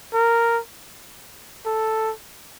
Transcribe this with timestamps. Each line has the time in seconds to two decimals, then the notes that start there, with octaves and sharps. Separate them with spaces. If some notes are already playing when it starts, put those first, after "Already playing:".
0.13 A#4
1.66 A4